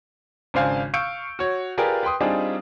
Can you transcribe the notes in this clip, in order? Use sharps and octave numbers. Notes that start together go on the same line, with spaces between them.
G#1 C#3 D4 C5 F5 G#5
F5 C#6 E6 G6 C#7 D7
F#4 C#5
F4 G4 G#4 A#4 B4 D5
B4 G5 C6 D#6
G3 C4 D4 D#4 F4 G#4